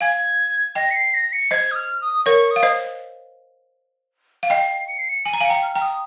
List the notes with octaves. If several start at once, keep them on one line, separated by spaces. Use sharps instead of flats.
F5 G#5 G#6
D#5 G5 A#6
C#7
C7
A#6
C#7
C5 D#5 G#6
D#6
F6
D#6
A#4 C#5 C#6
D#6
F5
C5 D#5
F5
D#5 G5 C7
C#7
C7
C#7
G#5 D#7
A#5
F5 G#5 C#7
G5 A#5
F6
G5 A#5 F6
D#6